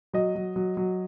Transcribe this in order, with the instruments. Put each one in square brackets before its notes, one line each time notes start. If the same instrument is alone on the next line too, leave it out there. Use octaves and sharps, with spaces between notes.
[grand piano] F#3 D#5
F#3
F#3
F#3